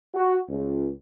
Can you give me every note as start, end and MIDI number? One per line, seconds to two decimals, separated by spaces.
0.14 0.36 66
0.48 0.90 37